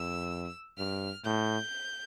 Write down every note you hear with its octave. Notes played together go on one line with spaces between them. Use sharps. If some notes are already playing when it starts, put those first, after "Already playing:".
Already playing: F2 E6
G2 F6
A2 G6